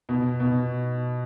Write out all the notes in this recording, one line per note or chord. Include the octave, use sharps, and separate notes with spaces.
B2
B2